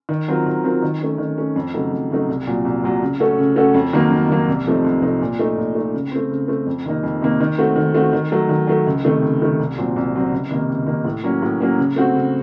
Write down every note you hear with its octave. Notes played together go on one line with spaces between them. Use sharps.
D#3
F#3 C4 F4 A#4
D#3
F#3 C4 F4 A#4
D#3
A3 C#4
D#3
A3 C#4
F2
C#3 F#3 A3 D#4
F2
C#3 F#3 A3 D#4
C2
A#2 F#3
C2
A#2 F#3
C#3
A3 C#4 F#4 A4
C#3
A3 C#4 F#4 A4
F2
D#3 F#3 A#3
F2
D#3 F#3 A#3
C2
C3 F3 A3 D#4
C2
C3 F3 A3 D#4
A#2
A3 D#4
A#2
A3 D#4
C#3
A3 C4
C#3
A3 C4
F2
C3 D#3 A#3 D#4
F2
C3 D#3 A#3 D#4
D#3
A3 C4 F#4
D#3
A3 C4 F#4
D#3
F#3 A3
D#3
F#3 A3
C#2
C3 D#3 A3
C#2
C3 D#3 A3
C2
A#2 F#3 C4
C2
A#2 F#3 C4
C#2
C3 D#3 A#3 D#4
C#2
C3 D#3 A#3 D#4
A2
F#3 A#3 C#4
A2
F#3 A#3 C#4
C#3
A3 C4 F#4
C#3